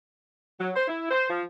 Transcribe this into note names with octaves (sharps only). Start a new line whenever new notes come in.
F#3
C5
E4
C5
F3